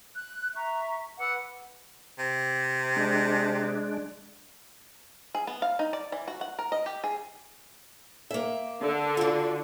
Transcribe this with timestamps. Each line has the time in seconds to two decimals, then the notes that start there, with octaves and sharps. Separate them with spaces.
0.15 F#6
0.55 E5 A#5 C#6
1.19 B4 F#5 D6 E6
2.18 C3
2.96 G#3 D4
5.35 G#4
5.47 B3
5.62 F5
5.79 D#4
5.93 D5
6.12 E3
6.28 F#4
6.41 F#5
6.59 A#4
6.72 D#5
6.86 G4
7.04 G#4
8.31 A#3 E5
8.81 D3
9.17 F4 F#4